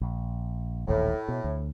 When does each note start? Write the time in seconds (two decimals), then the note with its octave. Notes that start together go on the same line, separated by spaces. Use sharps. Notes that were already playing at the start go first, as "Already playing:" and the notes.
0.01 A#1
0.88 D#1 A1 D#2 A2
1.28 B2
1.44 D2